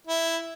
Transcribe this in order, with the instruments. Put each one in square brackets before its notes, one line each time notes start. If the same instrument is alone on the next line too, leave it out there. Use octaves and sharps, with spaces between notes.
[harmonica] E4